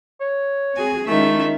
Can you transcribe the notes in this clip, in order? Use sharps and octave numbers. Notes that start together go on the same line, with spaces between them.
C#5
C4 F#4 G#4 G#5
D#3 G#3 A3 C#4 E4 F4 E5